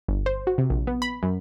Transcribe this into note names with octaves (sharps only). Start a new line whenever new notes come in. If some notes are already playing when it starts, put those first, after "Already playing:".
G1
C5
F#4
C3
A#1
B3
B5
F#2